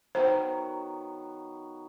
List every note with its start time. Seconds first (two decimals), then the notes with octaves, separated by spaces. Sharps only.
0.15 D#3 F#3 B3 C5